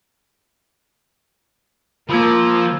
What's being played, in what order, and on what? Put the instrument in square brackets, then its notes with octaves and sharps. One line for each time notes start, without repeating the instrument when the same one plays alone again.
[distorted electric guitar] F3 [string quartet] A#3 [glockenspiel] B5 E6 G#6